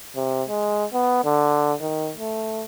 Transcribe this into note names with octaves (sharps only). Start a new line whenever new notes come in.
C3
G#3
B3
D3
D#3
A3